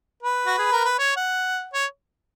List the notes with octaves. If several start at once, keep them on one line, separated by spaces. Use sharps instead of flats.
B4
F#4
G#4
A#4
B4
C#5
F#5
C#5